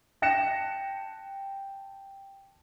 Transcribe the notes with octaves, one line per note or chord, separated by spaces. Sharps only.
G5 A5 F#6 A#6 C#7 E7